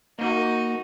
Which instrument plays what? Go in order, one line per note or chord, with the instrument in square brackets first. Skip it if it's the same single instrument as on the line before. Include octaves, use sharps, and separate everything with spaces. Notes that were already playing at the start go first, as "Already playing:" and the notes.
[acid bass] A#3 [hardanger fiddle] D#4 F#4